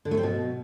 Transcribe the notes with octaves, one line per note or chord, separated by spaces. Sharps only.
D3
A3
C4
B2